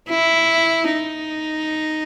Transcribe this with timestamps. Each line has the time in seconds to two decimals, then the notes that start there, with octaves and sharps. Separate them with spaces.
0.09 E4
0.93 D#4